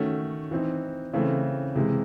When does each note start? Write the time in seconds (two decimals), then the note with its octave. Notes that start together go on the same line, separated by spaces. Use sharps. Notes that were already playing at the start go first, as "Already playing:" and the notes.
Already playing: D#3 A3 C#4 F#4
0.51 E3 C4 D#4
1.13 C#3 E3 A3 C4
1.75 C3 E3 G#3